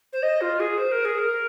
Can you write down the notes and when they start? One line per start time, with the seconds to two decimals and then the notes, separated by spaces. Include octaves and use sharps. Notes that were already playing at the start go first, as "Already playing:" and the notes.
0.13 C5
0.23 D#5
0.41 F4
0.60 G#4
0.78 C5
0.92 A#4
1.05 G#4
1.18 A#4